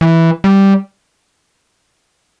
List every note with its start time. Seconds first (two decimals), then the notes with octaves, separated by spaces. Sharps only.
0.01 E3
0.44 G3